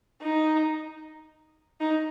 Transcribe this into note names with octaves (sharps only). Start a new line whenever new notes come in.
D#4
D#4